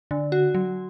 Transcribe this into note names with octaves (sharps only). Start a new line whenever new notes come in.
D3
F#4
F#3